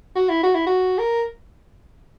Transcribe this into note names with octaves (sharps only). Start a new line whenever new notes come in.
F#4
E4
F#4
E4
F#4
A#4